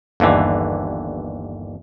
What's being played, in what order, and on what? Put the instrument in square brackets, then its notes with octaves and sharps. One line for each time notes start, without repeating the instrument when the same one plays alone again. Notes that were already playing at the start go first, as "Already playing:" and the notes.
[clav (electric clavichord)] G1 D#2 D3 E3